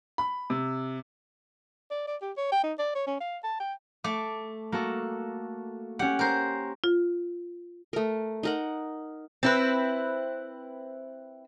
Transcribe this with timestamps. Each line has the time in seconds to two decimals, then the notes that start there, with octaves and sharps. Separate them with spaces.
0.18 B5
0.50 C3
1.91 D5
2.08 D5
2.21 G4
2.37 C#5
2.52 G5
2.63 D#4
2.79 D5
2.95 C#5
3.07 C#4
3.20 F5
3.43 A5
3.60 G5
4.04 A3 D6
4.72 A#3 F#4 A4
5.99 C#4 G4 F#5
6.19 A#4 C5
6.84 F4
7.93 A3 A#4
8.43 D#4 A#4 F#5
9.43 C4 E4 B4